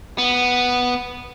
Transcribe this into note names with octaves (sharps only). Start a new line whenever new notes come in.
B3